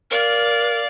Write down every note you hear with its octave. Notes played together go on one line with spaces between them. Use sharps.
A#4 D5 F5